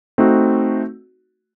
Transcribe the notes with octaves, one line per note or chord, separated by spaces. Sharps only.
A3 C4 D#4 F#4